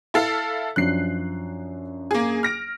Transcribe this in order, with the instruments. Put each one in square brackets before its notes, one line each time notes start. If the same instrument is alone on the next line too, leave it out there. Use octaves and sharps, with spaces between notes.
[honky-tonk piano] E4 A4 F5
[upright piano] F#2 F3 D4 [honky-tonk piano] F#6 C7
[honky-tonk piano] A#3 G#4
F6 A#6 D7